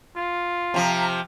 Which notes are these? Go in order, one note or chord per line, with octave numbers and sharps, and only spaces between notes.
F4
C3 F3 F5 A5 A#5